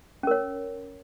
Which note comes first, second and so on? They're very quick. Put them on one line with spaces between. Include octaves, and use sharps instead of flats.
C#4 A#4 C#5